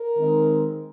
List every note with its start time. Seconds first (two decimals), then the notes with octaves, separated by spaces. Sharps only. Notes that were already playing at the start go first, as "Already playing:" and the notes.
Already playing: A#4
0.15 D#3 G#3 C4 D#4